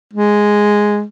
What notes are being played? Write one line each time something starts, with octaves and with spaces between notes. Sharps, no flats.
G#3